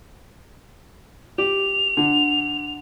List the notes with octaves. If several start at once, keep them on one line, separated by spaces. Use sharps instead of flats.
G4 F7
D3